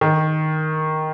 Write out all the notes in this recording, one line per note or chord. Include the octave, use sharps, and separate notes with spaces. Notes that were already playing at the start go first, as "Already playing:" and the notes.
D#3